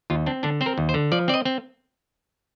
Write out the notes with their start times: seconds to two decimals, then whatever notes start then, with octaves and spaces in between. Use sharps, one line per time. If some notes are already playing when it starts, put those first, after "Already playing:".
0.10 D#2 F4
0.26 C4 D4
0.43 D3 D4
0.61 C4 C5
0.66 A#4
0.78 D#2
0.89 C5
0.94 D3
1.12 F3 D5
1.28 C4 D5
1.34 D#5
1.45 C4